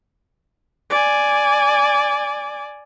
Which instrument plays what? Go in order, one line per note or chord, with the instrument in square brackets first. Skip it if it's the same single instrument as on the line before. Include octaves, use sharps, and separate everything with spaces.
[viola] D5 G#5